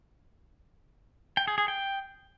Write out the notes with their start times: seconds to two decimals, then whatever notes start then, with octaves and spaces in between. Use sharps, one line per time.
1.37 G5
1.48 G#4
1.58 G#4
1.68 G5